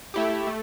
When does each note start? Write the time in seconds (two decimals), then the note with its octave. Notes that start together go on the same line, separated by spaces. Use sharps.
0.14 A3 E4 G4
0.47 A3